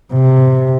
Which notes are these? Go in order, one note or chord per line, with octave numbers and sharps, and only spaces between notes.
C3